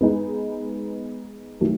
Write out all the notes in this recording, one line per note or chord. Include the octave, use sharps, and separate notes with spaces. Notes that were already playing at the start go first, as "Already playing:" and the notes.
G#3 B3 D#4 G#4 B4
D#3 F#3 A3